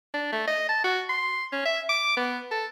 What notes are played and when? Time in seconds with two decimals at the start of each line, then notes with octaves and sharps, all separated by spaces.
0.14 D4
0.32 A3
0.47 D#5
0.69 A5
0.84 F#4
1.09 C6
1.52 C#4
1.65 E5
1.89 D6
2.17 B3
2.51 A4